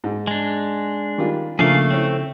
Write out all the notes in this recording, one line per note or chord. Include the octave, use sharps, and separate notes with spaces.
G#2
G#3 D4
D#3 G3 F4
C#3 F3 A3 A#3 D4 G#4 A4 F5
C4 C#4 E4